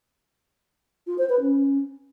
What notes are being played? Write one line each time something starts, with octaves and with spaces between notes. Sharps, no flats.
F4
C5
B4
C#4